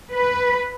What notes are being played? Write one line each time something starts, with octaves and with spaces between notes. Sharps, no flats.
B4